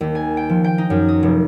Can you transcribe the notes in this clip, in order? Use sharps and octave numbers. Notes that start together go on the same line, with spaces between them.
D#2
G#5
G5
F3
G5
D#4
F#2
D#6
F1